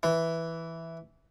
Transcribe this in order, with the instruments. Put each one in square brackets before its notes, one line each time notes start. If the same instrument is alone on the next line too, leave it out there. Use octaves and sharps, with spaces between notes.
[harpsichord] E3